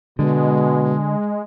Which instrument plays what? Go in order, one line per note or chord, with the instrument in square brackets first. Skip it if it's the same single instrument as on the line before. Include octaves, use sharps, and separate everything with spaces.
[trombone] B2 [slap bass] D3 [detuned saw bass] G#3